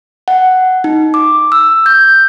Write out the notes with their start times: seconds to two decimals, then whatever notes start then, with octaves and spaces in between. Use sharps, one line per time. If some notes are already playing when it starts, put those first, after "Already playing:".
0.28 F#5
0.84 D#4
1.14 D6
1.52 E6
1.86 G6